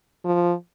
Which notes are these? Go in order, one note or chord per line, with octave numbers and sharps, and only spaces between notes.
F3